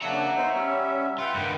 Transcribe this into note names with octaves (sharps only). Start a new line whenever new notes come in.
C#3 A#3 D4 E5 F#5 A#5
B3 D#4 C5
G3 C#4
F4 B4 F#5 G5
G2 D#3